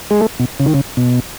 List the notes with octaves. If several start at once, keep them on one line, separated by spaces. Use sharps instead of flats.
G#3
A3
B2
C#3
D#3
C#3
B2